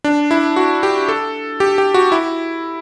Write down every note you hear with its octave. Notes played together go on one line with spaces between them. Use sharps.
D4
E4
F#4
G4
A4
G4
G4
F#4
E4